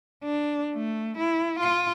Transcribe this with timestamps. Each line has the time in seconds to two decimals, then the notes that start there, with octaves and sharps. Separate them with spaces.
0.24 D4
0.74 A3
1.18 E4
1.59 F4